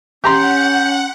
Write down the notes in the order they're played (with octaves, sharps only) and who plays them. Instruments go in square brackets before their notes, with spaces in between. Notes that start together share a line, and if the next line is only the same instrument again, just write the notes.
[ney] C#4 [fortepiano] G4 A#5 C6 [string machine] F#5 [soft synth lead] G6